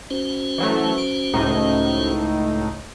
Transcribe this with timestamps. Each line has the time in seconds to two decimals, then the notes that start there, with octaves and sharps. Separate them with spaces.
0.10 C#4 F#4 C5
0.58 E3 F#3 A3
0.98 D7
1.34 C#2 A2 D#4